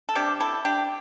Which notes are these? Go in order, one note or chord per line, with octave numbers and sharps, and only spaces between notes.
A4
C3 G3 D4 G4
E4 A4
D4 G4